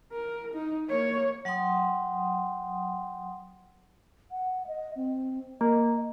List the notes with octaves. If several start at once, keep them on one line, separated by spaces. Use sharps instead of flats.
A#4
D#4
A#3 C#5
F#3 F#5 G5 C6 D#6
F#5
D#5
C4
A#3 D#5